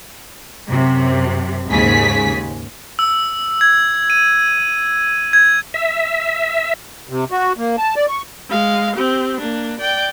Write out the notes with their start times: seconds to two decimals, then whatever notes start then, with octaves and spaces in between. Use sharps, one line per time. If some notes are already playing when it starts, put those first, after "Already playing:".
0.70 F#2 C3
1.68 D#2 G#2 C#3 G#4 B6
2.99 E6
3.61 G#6
4.10 D#7
5.33 G#6
5.74 E5
7.09 C3
7.31 F#4
7.57 A#3
7.78 A5
7.96 D5
8.08 C#6
8.49 G#3 F5
8.96 C4 G4
9.39 A#3 D4
9.80 D5 G5